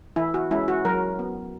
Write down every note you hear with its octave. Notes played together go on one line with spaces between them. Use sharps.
E3 E4
F#4
G#3 C#4 E4
F#4
F#3 A#4
B3